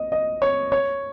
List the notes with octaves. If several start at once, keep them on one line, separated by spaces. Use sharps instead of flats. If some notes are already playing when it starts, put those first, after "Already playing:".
Already playing: D#5
D#5
C#5
C#5